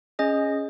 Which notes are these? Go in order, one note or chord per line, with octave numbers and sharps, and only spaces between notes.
C#4 G#4 D#5